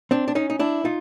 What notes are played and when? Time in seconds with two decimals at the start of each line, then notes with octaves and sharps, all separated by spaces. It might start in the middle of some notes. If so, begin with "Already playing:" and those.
0.11 C4 D4
0.28 D4
0.35 C#4 D#4
0.50 D#4
0.59 D4 E4
0.85 D#4 F4